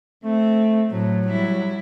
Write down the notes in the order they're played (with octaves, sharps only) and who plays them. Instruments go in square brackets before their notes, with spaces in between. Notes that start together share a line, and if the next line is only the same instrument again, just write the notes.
[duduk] A3 [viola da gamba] C4
[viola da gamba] A2 [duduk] F#3
[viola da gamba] G3 E4